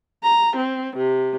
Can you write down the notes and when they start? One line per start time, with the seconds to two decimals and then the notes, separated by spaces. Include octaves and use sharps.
0.23 A#5
0.56 C4
0.97 C3